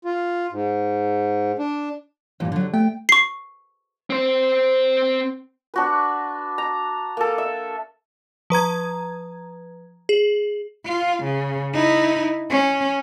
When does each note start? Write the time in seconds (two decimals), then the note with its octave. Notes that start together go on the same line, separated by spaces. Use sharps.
0.05 F4
0.52 G#2
1.59 D4
2.40 G2 A#2 E3
2.52 D3 F#3
2.74 A3 G5
3.09 C#6 C7
4.10 C4 C5
5.74 D4 F#4 B4
6.58 A#5
7.17 A#3 A4
7.38 E5
8.50 F3 B4 A#5 G#6
10.09 G#4
10.86 F4
11.23 C#3
11.73 D#4 E4
12.50 C#4